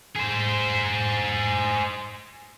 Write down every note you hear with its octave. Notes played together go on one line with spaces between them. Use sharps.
G#4 C5